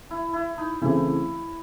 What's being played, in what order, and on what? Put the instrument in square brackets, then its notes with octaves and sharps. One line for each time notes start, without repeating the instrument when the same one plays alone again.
[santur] E4
E4
D#4
[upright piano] C#3 E3 A3 C4 [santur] E4